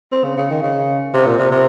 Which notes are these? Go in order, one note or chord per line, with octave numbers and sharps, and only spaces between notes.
C4
C#3
C#3
D#3
C#3
C3
A#2
C3
C3